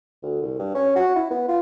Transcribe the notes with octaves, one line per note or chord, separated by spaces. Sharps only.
D2
C2
G2
C#4
F#4
E4
B3
F4